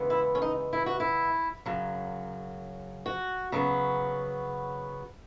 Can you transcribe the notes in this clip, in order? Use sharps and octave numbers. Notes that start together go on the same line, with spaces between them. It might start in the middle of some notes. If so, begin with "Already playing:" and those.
Already playing: C#3 E3 G#3 B3
E4
C#4
D#4
E4
F#4
E4
F#2 C#3 F#3
F#4
C#3 F#3 B3